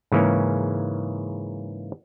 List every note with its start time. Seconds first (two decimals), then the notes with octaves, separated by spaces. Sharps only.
0.12 G#2 C#3 E3 A#3 C#4